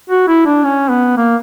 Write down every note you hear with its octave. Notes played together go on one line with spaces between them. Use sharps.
F#4
E4
D4
C#4
B3
A#3